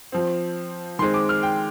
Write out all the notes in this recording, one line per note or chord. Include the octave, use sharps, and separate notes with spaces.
F3 C4
D#3 G#3 C4 C6
D6
F6
G5